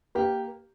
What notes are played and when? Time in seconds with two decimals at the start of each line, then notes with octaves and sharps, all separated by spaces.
0.15 A#3 G4